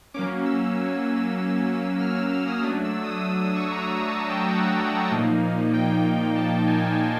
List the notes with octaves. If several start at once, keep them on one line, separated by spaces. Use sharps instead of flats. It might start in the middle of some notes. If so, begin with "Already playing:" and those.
F#3 A#3 C#4 D6
E6
F6
E6
E6
D#6
F#3 A3 D4 D#6
E6
D#6
E6
E6
C#6
A#5
A#5
A5
G5
F#5
A#2 F3 A#3 D#4
G5
G5
A5
G#5